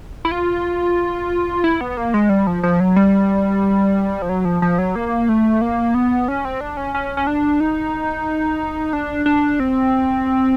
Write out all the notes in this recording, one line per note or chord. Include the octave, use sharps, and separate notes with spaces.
E4
F4
E4
B3
A#3
G#3
G3
F3
F3
F#3
G3
F3
F#3
F3
F3
F#3
A#3
A3
A#3
B3
C#4
C4
D4
C#4
C#4
C#4
D4
D#4
D4
D4
C4